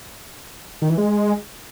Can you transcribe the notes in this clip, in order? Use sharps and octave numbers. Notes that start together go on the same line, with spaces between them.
D#3
E3
G#3